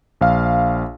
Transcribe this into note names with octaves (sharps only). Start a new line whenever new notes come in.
A#1 F5 F6